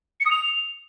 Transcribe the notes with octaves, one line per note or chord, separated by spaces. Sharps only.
C#7
D#6
F7